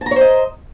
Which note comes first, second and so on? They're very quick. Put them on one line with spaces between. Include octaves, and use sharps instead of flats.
A5 A#5 C#5 C5 D#5